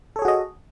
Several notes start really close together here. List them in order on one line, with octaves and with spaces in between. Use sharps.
A4 C#5 G#4 F#4 D#5